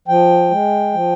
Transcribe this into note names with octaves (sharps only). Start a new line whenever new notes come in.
F3 G5
G#3
F3